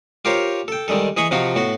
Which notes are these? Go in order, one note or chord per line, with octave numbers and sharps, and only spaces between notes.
F4 G4 A#4 C5 C#5
A4 G5
D#3 G3 G#3 A4
E3 G#4 D#5 B5 C#6 D#6
C3 F3 D#4 F4 F#4
A2 B3 F#4